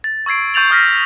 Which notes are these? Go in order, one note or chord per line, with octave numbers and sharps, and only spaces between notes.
A6
C#6 E6 G#6 C7 D7
C#6 G6 A6 F7 F#7
D#6 F6 A#6 B6